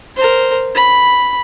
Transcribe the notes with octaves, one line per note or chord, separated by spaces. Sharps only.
A#4 C5
B5